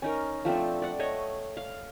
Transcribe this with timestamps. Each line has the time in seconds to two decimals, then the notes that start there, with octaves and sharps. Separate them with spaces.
0.02 C#4 D#4 A#4
0.45 F3 A3 C4 D4
0.82 D5 F#5
0.99 A3 C#5 D#5
1.57 F5